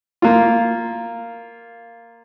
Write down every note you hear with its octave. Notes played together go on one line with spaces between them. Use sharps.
A#3 F4